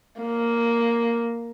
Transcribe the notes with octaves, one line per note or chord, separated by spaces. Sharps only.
A#3